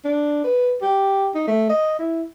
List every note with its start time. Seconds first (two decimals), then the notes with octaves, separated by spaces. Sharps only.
0.05 D4
0.44 B4
0.82 G4
1.35 D#4
1.47 A3
1.69 D#5
1.99 E4